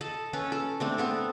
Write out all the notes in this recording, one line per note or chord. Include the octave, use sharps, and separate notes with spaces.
A4 D#5 A5
C#4 A4 B4
A4
A3 C4 D4
B3 C4 A4